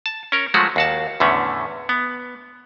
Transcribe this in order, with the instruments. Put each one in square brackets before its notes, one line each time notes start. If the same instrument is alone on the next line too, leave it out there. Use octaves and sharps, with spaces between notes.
[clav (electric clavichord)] A5
C#4 A#4 C#5
F3 F#3 G#3 A3 F#4
D#2 F#4 A5
E2 A2 D3 A3 C#4
B3